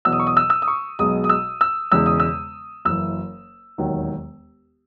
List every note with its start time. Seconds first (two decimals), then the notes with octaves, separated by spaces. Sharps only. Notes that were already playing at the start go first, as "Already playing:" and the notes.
0.05 E2 B2 F#3 E6
0.12 D#6
0.20 C#6
0.27 D#6
0.37 E6
0.50 E6
0.62 D#6
0.68 C#6
0.99 B1 B2 G#3 D#6
1.24 D#6
1.29 E6
1.61 E6
1.92 E1 E2 C#3 G#3 E6
2.06 D#6
2.20 E6
2.85 F#1 F#2 E3 E6
3.78 E1 D#2 D#3 F#3